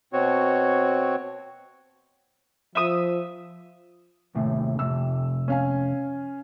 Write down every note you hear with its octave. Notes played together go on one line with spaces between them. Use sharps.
B2 C4 F#4 C#5
F3 E5 D#6
D#2 A2 C3
F2 C3 E6
C#4 F5 G#5